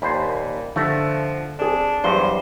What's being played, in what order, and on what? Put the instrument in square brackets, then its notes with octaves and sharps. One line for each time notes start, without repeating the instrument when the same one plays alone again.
[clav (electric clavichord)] D#2 C5 [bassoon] A#2 [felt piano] B5
[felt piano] D3 A#6 [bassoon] F3 [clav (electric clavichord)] A3
[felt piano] C4 G#4 [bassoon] D4
[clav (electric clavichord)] E2 G2 [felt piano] F#3 F5 C7 [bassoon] C5